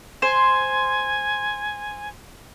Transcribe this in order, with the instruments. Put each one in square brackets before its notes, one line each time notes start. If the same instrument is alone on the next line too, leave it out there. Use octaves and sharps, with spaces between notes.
[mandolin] C5 [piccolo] G#5